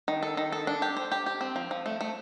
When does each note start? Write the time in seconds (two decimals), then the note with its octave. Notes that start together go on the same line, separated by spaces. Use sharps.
0.08 D#3
0.23 A4
0.37 D#3
0.52 A4
0.67 D4
0.82 G4
0.97 C5
1.12 G4
1.26 G4
1.41 C4
1.56 F3
1.71 F3
1.86 A3
2.01 A3